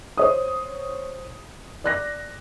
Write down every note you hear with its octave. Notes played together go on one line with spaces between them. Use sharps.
C5 C#5 D#6
D5 F#6 A#6